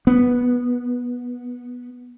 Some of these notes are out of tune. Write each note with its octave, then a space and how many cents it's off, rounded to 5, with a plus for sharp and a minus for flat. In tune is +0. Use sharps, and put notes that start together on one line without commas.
B3 -10